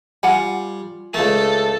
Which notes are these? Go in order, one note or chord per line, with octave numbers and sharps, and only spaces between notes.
G3 F4 F#5 G#5
C#2 A3 A4